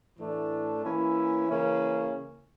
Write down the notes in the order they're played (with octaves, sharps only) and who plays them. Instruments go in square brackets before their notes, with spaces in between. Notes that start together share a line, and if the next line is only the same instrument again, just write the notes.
[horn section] A2 E3 A3 D4
E3 A#3 C#4 E4
C#3 E3 A#3 C#4